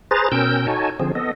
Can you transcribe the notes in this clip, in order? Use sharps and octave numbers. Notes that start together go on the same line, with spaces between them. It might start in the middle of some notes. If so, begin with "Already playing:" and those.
G#4 B4 C5 A#5 A6
B2 C#4 A#4 G5 E6 G6
D#4 F#4 A4 C#5 G#5 A5
D3 F3 C4 G#4
B3 A4 D#5